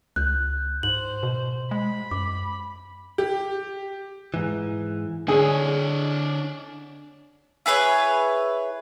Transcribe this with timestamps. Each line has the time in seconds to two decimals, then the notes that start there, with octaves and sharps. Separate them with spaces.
0.16 C#2 F#6 G6
0.83 G#2 C5 F#7
1.23 B2
1.71 G#3 B5
2.11 F#2 D6
3.18 G4
4.34 G#2 E3
5.28 D3 D4 G#4 C#5
7.66 E4 G#4 B4 C#5